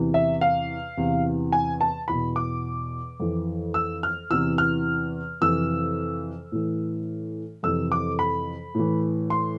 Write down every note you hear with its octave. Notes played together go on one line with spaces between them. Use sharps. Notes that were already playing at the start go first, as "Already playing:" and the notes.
Already playing: E2 C3 E3
E5
F5
E2 C3 E3
G#5
A5
E2 B2 B5
D6
F2 E3
E6
F6
E2 C3 E3 E6
F6
F2 C3 E3 E6
A2 E3
F2 C3 E3 E6
D6
B5
A2 E3
C6